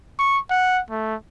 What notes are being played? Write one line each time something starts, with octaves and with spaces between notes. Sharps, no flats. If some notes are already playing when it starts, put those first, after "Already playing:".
C#6
F#5
A3